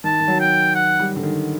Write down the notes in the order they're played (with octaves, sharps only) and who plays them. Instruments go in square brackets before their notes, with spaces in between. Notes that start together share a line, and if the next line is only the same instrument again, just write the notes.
[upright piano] D#3 [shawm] A5
[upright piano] D#3
F#3
[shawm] G5
F#5
[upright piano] G3
D3
D#3